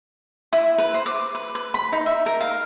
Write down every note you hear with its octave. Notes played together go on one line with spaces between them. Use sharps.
E4
B4
C5
D6
B4
B4
B5
D#4
E5
A#4
F5